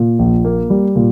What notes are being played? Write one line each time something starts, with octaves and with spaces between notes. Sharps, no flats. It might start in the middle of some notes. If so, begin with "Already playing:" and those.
Already playing: A#2
A#1
A#3
G3
A#2